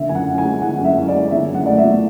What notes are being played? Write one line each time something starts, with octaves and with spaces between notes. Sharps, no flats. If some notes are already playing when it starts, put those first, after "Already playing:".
Already playing: D3 E5
F#2 G#5
F#5
C#4
G#5
G#3
D3 F#5
F#2
E5
C#4
D5
G#3
D3 E5
F#2
F#5
A3 D5
E5
F#3